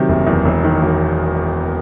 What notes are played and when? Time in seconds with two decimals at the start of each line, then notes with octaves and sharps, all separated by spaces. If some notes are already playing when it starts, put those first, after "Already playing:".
Already playing: C3 D#3 F#3
0.09 F#1
0.27 E2
0.45 E1
0.64 D#3
0.82 E1